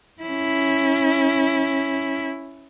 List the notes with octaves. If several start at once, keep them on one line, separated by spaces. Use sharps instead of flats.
C#4 E4